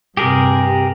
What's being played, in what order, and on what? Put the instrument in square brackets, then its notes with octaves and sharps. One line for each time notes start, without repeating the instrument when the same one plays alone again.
[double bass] G2 C3 [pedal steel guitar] G4 G#4 A#4